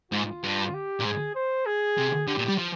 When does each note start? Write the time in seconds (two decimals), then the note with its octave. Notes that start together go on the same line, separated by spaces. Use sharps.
0.12 G#2 F4
0.43 G2
0.74 G4
1.00 A#2
1.05 G#2 G#4
1.35 C5
1.66 G#4
1.97 C3
2.27 D3 G4
2.38 A#2
2.48 G3
2.58 F3